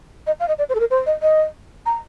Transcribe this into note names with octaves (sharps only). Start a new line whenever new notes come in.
D#5
F5
D#5
D5
C5
A4
A#4
C5
D#5
D#5
A#5